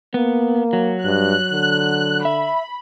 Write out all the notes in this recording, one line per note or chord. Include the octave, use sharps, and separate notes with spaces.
A#3 B3
F#3
G2 F#6
D3
E5 B5